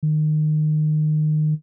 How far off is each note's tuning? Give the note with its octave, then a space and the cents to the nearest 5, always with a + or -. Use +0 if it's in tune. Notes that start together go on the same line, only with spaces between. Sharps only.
D#3 -25